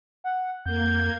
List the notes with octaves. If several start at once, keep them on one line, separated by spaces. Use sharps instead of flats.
F#5
F2 A#3 G6 G#6